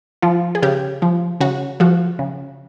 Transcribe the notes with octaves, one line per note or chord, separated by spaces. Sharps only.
F3 F4
G#4
C#3 G4
F3
C#3 F#4
F3 F#4
C#3